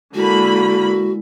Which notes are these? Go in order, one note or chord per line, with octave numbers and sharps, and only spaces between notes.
D3 G#3 A#3 E4 F#4 B5